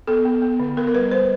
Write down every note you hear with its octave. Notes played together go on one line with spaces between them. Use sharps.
B3 A4
B3
B3
D3
B3 A#4
A#4
G3 B4
G3 C5